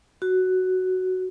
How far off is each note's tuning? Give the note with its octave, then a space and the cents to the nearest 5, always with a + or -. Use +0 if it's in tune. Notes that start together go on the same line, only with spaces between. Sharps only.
F#4 +5